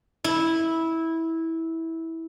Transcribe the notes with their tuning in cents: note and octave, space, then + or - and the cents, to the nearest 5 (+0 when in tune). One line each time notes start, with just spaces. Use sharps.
E4 -15